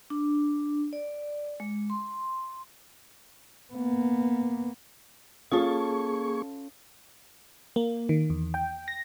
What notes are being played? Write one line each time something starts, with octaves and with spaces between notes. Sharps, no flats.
D4
D5
G#3
C6
A#3 B3
A#3 C#4 F4 G#4 A4 C#6
A#3
D#3
E2
G5
A#6